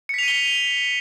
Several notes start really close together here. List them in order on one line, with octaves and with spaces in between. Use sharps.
C#7 B6 F7 D#7 G7